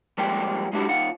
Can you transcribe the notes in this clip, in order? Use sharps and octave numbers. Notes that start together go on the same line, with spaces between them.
F3 G3 G#3 A#3 B3 G4
G#3 D4 E4 F#4 G4
D#2 D#3 F4 F#5